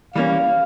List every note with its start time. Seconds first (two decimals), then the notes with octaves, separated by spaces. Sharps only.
0.14 E3 G3 A#3 C#4 F5